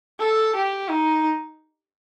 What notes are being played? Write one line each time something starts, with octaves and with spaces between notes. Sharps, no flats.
A4
G4
D#4